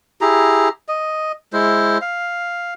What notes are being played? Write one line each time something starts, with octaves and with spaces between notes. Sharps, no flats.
E4 G4 G#4 A#5
D#5
G#3 E4 C5
F5